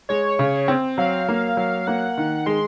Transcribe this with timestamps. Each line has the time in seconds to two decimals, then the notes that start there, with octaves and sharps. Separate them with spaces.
0.09 G#3 C#5
0.39 C#3
0.68 C4
0.98 F#3 F5
1.29 A#3
1.57 F#3
1.87 A#3 F#5
2.18 D#3
2.46 G#3 C6